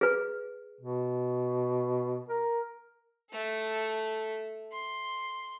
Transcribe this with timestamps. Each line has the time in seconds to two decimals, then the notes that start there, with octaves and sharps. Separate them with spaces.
0.01 G#4 B4
0.81 B2
2.29 A#4
3.31 A3 A4
4.71 C6